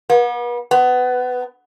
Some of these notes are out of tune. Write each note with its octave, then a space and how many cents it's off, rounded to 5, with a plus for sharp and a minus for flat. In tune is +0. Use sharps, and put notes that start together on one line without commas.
B3 -40
B3 +20